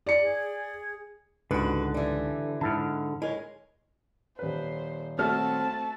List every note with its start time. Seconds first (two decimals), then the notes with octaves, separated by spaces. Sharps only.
0.06 D5 C#7
0.22 G#4
1.51 C#2 G#2 D3 F#4 B4
1.94 E3 G3
2.61 G#2 D3 E4 A5 F6
3.22 G#3 E4 A#4 C#5
4.39 D#1 B4 C5
5.19 A3 C4 F#4 A4 A5 F6